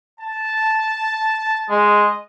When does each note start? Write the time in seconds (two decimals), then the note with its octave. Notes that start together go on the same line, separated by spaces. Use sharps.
0.20 A5
1.70 G#3 D#5